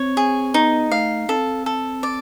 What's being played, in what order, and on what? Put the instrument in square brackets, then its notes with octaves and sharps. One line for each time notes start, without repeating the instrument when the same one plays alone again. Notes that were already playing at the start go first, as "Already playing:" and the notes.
Already playing: [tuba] C4 [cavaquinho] C#5
[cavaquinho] G#4
[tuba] B3 [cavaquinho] D#4
[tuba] A3 [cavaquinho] F5
[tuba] C4 [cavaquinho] A4
[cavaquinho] A4
D5